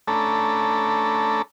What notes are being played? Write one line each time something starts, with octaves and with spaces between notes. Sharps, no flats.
A3 C#4 D4 A4 A#5 B5